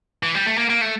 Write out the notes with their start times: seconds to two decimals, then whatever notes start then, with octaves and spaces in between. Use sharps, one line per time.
0.23 E3
0.35 G3
0.46 A3
0.57 A#3
0.70 A#3
0.81 A3